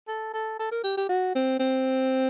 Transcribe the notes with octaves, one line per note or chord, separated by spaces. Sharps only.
A4
A4
A4
A#4
G4
G4
F#4
C4
C4